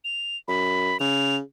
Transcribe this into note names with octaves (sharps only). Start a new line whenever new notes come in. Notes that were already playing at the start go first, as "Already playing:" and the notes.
F7
F#2 B5
C#3 F7